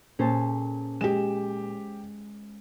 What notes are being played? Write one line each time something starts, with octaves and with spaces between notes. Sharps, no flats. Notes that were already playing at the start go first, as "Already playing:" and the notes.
A#2 C#4 G#4 A4 C5 A5
G#3 G4 E7